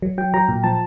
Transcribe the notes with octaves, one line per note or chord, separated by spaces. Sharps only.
F#3
F#3 G5
F#3 A#5
A#2
F3 A5